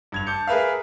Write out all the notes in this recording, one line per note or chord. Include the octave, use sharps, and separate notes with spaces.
G2 G#6 F7
A5 D6 G6 C#7
G#4 A#4 B4 E5 F5